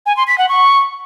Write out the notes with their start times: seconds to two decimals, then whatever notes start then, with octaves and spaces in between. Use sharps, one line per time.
0.06 G#5
0.17 C6
0.27 B6
0.38 F#5
0.49 C#6